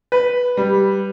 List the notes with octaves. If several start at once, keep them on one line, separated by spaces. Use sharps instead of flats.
B4
G3